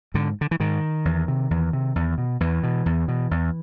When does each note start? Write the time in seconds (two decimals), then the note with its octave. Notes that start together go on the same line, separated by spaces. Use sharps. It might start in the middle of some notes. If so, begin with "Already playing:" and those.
0.14 G#2 D3
0.41 D3
0.51 E3
0.60 G#2 D#3
1.05 E2
1.28 C3
1.51 E2
1.73 C3
1.96 E2
2.18 B2
2.40 E2 E3
2.63 B2
2.86 E2
3.08 B2
3.31 E2